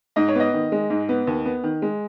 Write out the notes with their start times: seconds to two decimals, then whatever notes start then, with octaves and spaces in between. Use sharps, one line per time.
0.16 G#2 D#5
0.28 C#5
0.35 B3 D#5
0.54 D#3
0.72 G#3
0.90 G#2
1.09 B3
1.27 D#2
1.45 B3
1.64 D#3
1.82 G#3